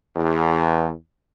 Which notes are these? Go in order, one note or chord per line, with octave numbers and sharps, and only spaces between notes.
E2